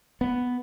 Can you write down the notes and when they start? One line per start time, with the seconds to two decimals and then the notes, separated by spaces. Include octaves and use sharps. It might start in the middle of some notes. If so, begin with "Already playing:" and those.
0.21 B3